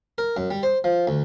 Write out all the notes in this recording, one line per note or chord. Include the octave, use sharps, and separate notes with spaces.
A#4
F#2
G3
C5
F3
D2